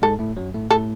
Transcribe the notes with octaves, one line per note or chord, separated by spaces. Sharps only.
G#2 G#3 A4
A2 A3
F#2 F#3
A2 A3
A2 A3 A4